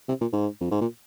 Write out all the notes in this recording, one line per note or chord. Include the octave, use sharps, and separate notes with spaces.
C3
A#2
G#2
F2
G#2
A#2